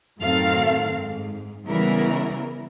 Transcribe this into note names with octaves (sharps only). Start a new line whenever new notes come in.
F#2 A2 D#3 C4 A4 F5
G#2
C#3 E3 G3 B3 E4 A#4